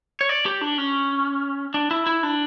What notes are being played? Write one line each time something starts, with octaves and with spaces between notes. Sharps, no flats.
C#5
D5
G4
D4
C#4
D4
E4
E4
D4